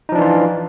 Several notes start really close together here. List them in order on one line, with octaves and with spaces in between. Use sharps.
D#4 F3 D4 E3 F4